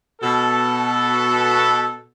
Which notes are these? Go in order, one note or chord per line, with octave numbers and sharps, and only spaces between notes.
B2 A4